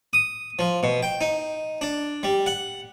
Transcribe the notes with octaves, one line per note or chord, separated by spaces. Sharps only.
D#6
F3
B2
G5
D#4
D4
G3
F#5